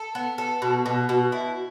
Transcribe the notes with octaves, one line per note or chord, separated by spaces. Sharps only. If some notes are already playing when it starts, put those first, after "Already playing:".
Already playing: A4
B3
A4
B2
B2
B2
E4